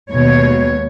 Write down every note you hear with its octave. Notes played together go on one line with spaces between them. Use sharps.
D#2 B2 G#3 C#5